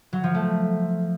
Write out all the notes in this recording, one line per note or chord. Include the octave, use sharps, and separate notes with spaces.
F#3
F3
A3